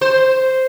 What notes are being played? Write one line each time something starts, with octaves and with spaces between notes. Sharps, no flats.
C5